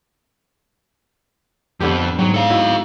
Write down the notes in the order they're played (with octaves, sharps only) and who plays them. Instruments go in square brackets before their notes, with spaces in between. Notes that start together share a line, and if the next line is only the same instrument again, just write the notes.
[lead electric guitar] F2 [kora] D3 B3 G4
[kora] G#2 G5 [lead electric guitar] F#3
[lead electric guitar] A4 F5
[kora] D#4 E4 F#4